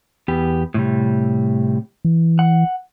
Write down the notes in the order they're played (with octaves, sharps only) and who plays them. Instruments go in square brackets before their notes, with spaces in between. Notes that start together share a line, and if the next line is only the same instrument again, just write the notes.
[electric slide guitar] E2 B3 G4
A2 C3 G3
[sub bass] E3
[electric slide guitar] F#5